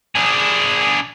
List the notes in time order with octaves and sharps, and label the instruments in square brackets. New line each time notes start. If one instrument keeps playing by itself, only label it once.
[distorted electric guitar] D4 G#4